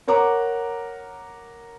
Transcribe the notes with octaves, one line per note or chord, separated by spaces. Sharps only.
A#4 C#5 F#5 A#5 D6